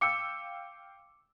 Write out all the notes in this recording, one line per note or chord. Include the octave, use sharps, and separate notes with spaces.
F5 G5 D6 E6 C#7